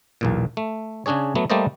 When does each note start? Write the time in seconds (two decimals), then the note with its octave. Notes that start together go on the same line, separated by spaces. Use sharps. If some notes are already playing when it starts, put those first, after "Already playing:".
0.21 B1 E2 A#2
0.57 A3
1.06 C#3 C#4 D4 G#4 C#5
1.35 F#3 A3 B3
1.50 G3 A3 A#3 C5 D5 D#5